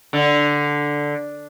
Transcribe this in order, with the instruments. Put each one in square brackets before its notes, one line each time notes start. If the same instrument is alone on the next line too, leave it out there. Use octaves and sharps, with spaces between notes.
[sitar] D3